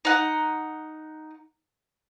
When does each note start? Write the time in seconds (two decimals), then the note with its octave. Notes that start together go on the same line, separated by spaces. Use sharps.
0.05 D#4 F#5